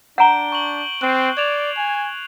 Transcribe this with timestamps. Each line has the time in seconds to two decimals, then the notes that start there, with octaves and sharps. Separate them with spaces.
0.18 D4 F#5 A#5 G6 D7 G7
0.52 C#6 F#7
1.02 C4 F#6 C7
1.37 D5 G#6 E7 F7
1.77 G#5